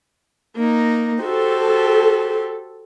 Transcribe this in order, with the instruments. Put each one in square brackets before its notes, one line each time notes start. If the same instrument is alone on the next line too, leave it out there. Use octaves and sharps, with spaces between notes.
[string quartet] A#3 D#4
[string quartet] F#4 G4 C5 [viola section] A4